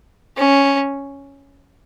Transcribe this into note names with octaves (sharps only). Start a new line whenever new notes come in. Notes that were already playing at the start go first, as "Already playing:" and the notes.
C#4